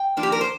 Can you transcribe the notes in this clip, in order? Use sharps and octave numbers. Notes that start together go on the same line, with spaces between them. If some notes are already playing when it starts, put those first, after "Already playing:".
Already playing: G5
F3 A#3 D4
G4
A#4
C5